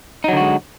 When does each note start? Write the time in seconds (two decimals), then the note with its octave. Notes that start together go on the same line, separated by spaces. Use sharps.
0.24 D#4
0.28 F#3
0.33 D3
0.37 F#4
0.41 G#3